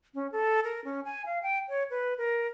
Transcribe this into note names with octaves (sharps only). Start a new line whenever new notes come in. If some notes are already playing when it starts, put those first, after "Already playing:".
C#4
A4
A#4
C#4
G#5
F5
G5
C#5
B4
A#4